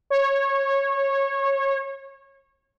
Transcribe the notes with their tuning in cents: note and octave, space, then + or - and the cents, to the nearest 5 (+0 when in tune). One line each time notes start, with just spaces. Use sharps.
C#5 -20